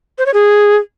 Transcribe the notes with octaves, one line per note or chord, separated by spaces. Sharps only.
C5
C#5
G#4